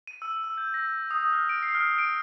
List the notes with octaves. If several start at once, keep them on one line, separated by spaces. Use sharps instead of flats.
D#7
E6
E6
G6
A#6
D#6
F6
D7
C7
F6
D7